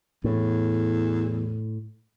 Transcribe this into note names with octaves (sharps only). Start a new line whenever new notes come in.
E2 A2